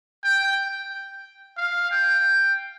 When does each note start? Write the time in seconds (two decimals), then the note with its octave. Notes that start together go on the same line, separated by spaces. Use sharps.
0.23 G5
1.57 F5
1.91 G5